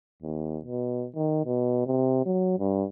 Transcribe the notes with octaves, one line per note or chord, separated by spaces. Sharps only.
D#2
B2
D#3
B2
C3
F#3
G2